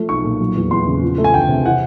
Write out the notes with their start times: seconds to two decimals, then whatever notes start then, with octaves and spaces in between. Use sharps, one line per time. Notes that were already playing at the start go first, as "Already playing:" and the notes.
Already playing: F3 A3
0.09 B1 C#6
0.24 A#2
0.40 F#3
0.56 E2
0.71 E2 C6
0.87 C#3
1.02 F3
1.18 A3
1.24 G#5
1.33 D2 G5
1.49 C3
1.65 E3 F#5